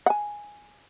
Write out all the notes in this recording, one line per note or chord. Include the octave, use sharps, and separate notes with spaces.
F#5 G#5